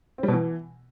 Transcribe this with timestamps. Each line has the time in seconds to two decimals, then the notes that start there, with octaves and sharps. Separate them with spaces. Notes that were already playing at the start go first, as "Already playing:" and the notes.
0.18 C4
0.23 G3
0.28 B2
0.33 E3